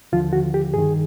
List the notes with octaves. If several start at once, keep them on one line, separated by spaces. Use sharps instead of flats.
D#2 D3 F3 F4
F#4
G4
G2 D#3 G#4